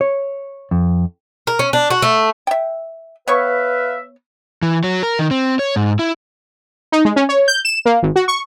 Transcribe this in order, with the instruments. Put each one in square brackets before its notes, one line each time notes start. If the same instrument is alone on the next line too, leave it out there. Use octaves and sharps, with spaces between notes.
[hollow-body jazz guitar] C#5
F2
[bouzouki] A#4
C#4
D4
F#4
A3
[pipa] E5 G5
[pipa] B3 C#5 C#6 [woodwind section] B4 E5 F5
[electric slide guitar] E3
F#3
A#4
D#3
C4
C#5
G#2
E4
[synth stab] D#4
G#3
C#4
C#5
G6
E7
A#3
G#1
F#4
C#6